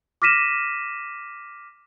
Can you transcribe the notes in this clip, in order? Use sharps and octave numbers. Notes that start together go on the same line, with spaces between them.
D6 F6 A#6 B6 D#7 E7